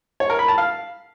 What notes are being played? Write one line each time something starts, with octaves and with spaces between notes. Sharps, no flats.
C#5
A#4
B5
A5
F5